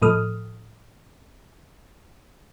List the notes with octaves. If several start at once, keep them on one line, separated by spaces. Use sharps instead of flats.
A2 F3 A4 D#6 F6